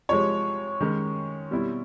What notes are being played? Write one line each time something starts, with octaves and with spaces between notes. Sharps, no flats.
C3 F3 G#3 C#5
D#3 G#3 C#4
B2 G3 C4 E4